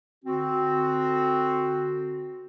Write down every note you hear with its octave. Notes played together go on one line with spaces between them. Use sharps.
D3 C4 F#4